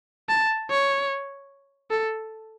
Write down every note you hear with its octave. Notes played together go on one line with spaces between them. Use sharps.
A5
C#5
A4